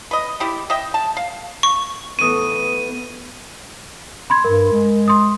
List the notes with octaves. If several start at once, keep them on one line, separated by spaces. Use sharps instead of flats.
B4 D#5
G3 E4 G4
D#5 E5 G5
A5
F5
C#6
A2 E3 A3 B3 C#6 D#6 D#7
B5 C6 G#6
G2 A#4
G#3
C6 D#6